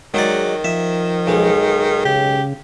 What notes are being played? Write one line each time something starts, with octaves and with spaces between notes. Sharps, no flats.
D#3 F#3 G#3 F#4 D5
F3 E5
B1 G#3
C#3 G4